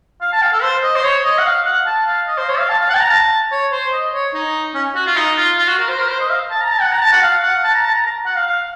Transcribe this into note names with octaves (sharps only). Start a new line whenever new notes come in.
F5
A5
F5
A4
C5
D#5
C5
C#5
D#5
F#5
F5
F#5
A5
F5
D#5
C5
C#5
F5
A5
F5
F#5
A5
A#5
A5
C#5
C5
D#5
C#5
D#4
C#4
F#4
F4
D#4
F4
F4
F#4
A#4
C5
A#4
C5
D#5
F5
A5
A#5
A5
F#5
A#5
A5
F#5
F5
F#5
A5
A#5
A5
A#5
A#5
F#5
F5
F5